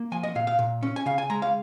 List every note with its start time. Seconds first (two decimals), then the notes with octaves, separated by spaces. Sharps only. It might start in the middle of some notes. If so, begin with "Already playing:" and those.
Already playing: A#3
0.12 F3 G#5
0.23 D#5
0.35 A#2 F5
0.47 F5
0.59 A#2
0.83 C#4
0.96 G#5
1.06 C#3 F5
1.18 G#5
1.30 G#3 A#5
1.42 F5